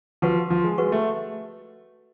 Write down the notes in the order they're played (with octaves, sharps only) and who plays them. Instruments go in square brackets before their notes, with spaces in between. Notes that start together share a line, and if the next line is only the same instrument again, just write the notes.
[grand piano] F3 [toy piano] F#4 B4 F#5 C#6
[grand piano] F3
G#3
[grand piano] G#3 [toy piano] F#4 B4 F#5 C#6
[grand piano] A3